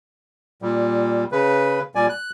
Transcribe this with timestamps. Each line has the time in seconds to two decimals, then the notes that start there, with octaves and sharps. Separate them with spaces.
0.62 A#2 G3
1.32 C#3 B4
1.95 A#2 G3 D5 G#5
2.09 F#6